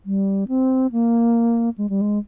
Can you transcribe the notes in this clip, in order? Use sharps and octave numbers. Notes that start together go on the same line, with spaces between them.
G3
C4
A#3
G#3
G3
G#3